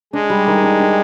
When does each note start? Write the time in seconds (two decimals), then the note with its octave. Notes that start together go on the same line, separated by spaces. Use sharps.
0.13 G#3 D4
0.30 G3
0.47 D#3
0.63 D4
0.80 D4